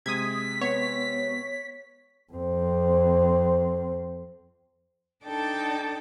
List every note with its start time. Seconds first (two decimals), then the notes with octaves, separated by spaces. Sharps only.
0.06 C3 G#3 D#6 G#6 B6
0.61 B3 C#5
2.33 F2 C4
5.26 D4 D#4 A4 G5 A5 D6